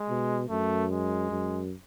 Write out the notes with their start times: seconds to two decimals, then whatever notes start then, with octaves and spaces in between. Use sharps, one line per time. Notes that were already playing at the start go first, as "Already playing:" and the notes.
Already playing: G#3
0.09 B2
0.49 F#2 A3
0.91 G#3
1.31 F#2